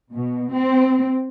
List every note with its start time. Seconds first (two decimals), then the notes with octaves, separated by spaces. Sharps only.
0.13 B2
0.52 C4